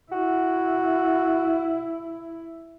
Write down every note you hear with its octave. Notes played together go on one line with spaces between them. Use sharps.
E4 F#4